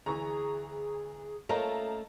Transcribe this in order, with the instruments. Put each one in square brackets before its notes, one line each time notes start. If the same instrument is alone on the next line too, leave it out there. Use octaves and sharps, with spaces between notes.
[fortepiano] D2 E3 [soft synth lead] G#4 [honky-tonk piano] A#5 C#6
[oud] A3 C#4 A#4 [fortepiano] A#3 F4 D#5 [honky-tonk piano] A5 A#5